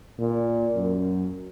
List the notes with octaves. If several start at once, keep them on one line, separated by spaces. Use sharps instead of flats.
A#2
F#2